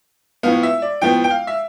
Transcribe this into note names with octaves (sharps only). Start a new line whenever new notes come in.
A2 F3 B3 F5
E5
D5
A2 F3 B3 G5
G5
F5
E5